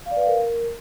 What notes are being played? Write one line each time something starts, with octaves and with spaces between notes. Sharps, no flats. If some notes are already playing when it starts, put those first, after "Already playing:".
F5
D5
B4
F5
A#4